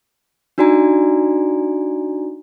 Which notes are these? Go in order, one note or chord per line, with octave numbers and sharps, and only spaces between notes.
D4 D#4 F#4 D5 G#5 A#5